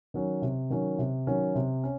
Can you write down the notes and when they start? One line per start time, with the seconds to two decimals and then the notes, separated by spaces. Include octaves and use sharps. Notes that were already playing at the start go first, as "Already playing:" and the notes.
0.14 D#3 F#3 C#4
0.42 C3
0.70 D#3 F#3 C#4
0.99 C3
1.27 D#3 F#3 C#4
1.55 C3
1.83 C#4